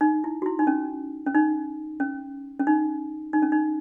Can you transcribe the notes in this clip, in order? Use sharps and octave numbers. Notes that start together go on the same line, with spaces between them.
D#4
E4
F#4
E4
D#4
C#4
C#4
D#4
C#4
C#4
D#4
D#4
C#4
D#4